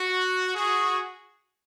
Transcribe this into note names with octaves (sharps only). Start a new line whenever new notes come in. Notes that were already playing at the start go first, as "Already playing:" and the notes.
Already playing: F#4
F#4 G#4